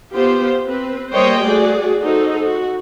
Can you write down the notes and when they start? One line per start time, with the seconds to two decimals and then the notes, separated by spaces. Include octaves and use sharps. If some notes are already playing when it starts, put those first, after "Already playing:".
0.14 B3 F4 G4 C5
0.66 C4 B4
1.12 G3 A#3 C5 C#5 D#5 G5
1.42 A3 F#4 G#4 D5
2.01 D#4 F#4 A4 C5
2.45 F#4